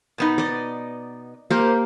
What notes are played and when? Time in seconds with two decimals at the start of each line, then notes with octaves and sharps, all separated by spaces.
0.18 B2 B3 D#4
0.38 D5 D#5
1.50 A#3 G4 A#4 C5